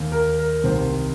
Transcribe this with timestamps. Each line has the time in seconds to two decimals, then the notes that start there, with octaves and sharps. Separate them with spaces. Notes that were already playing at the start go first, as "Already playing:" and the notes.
Already playing: D#2 D#3
0.12 A#4
0.39 A#4
0.64 C2 C3 D#3 C5